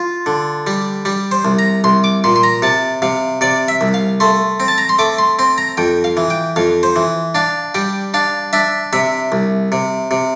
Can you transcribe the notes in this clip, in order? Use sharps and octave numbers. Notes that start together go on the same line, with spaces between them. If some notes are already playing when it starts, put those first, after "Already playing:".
Already playing: F4
D3
G3
G3
C5
C2
A#5
C2 C6
D6
A#2 C6
C6
A#5
C3 A5
C3 F5
C3 D5
E5
C2
F5
A3 C6
C4
A5
A#5
C6
A3 D6
C6
C4 C6
A#5
F2 G5
F5
E3
G5
F2 F5
C5
E3
D4 F5
G3 G5
D4 F5
D4 E5
C3 E5
C2
C3
C3